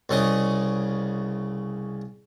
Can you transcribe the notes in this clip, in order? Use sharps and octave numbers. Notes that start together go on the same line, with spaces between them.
C2 C#3 D#5